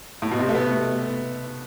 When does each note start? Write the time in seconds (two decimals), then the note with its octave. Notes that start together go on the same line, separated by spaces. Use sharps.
0.22 A2
0.31 B2
0.39 C3
0.49 A3
0.55 B3